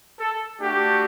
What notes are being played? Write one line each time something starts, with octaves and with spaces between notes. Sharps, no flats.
A4
A3 D4 F#4 G4